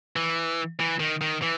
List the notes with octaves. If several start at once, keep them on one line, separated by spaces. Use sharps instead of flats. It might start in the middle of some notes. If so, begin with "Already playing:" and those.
E3
E3
D#3
D#3
E3